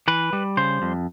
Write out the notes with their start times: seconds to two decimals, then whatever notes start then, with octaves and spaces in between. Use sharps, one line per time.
0.08 E3 B4
0.33 G3
0.57 C#3 C5
0.82 F2